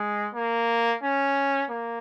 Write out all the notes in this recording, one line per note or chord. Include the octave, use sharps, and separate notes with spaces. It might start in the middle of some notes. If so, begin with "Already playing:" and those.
Already playing: G#3
A#3
C#4
A#3